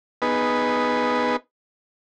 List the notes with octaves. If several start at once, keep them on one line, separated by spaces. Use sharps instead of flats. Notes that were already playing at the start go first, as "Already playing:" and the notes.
B3 D#4 G#4 B4